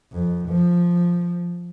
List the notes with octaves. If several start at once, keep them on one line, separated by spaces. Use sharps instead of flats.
F2
F3